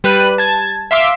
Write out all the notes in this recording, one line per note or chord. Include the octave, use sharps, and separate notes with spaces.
G3 B4 F#6 D#7
A5 G#6
E5 F5 C6 D6 E6